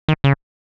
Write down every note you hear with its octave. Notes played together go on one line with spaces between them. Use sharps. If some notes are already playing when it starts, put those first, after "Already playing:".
D#3
C#3